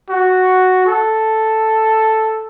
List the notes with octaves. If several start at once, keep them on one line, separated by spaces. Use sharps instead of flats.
F#4
A4